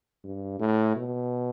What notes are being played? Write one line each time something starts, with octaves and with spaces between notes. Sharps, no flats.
G2
A2
B2